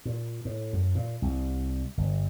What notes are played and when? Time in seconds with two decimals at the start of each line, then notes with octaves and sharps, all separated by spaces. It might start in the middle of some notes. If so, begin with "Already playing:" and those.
0.05 A#2
0.45 A2
0.73 F#2
0.95 A#2
1.22 C2
1.97 G1